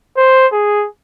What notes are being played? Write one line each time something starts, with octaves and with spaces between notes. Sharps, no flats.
C5
G#4